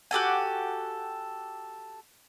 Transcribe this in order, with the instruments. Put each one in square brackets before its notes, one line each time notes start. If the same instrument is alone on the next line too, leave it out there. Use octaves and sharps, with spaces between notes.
[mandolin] F#4 G4 A4 G#5